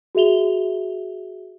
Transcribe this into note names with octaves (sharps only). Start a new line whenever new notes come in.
F#4 G#4 E5 F7 G7